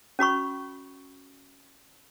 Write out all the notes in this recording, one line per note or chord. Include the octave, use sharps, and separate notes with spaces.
C#4 F#4 B5 C#6